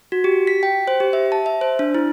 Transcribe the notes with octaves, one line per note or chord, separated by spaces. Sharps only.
F#4
G4
B6
G5
C5
G4
E5
A5
E5
C5
D4
E4